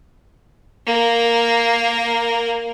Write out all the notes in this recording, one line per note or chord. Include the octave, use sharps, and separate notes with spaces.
A#3 A#4